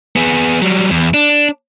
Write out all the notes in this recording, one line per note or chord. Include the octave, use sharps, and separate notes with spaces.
B3 G#4
F#3 G3
E2
D4